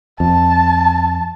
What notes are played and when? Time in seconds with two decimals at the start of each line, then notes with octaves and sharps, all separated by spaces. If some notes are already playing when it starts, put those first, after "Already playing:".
0.20 F2 A5